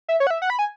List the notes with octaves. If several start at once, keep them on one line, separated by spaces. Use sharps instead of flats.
E5
C#5
F#5
E5
F#5
B5
G#5